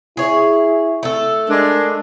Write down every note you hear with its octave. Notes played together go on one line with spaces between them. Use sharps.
E4 G#4 C#5
A3 A4
G#3 D4 A#4